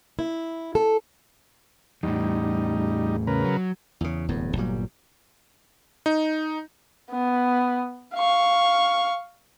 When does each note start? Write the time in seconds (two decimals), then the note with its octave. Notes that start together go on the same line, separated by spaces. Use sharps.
0.19 E4
0.75 A4
2.03 E2 A2 G3 D#4
3.27 C#3 A#4 B4
3.45 F#3
4.01 E2 C#3
4.29 D1 E2 G2
4.56 G1 A#2 F#3 G3
6.06 D#4
7.10 B3
8.15 F5 C#6